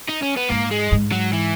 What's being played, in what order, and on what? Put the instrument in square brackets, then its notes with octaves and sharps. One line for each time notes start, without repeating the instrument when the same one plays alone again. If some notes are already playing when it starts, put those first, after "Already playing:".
[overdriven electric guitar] D#4
C#4
B3
[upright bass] G#2 [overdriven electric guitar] A#3
[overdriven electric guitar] G#3
[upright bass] G#2
[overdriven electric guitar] F#3
E3